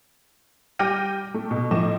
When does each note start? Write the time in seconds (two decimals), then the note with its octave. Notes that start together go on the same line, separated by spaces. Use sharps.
0.79 G3 G5 D6 F6 A#6 D#7
1.34 A3
1.51 B2
1.71 A2 F3 D#5 D6 E7